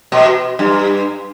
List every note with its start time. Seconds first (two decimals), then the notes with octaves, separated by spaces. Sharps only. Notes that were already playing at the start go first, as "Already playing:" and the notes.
0.12 B2
0.59 G2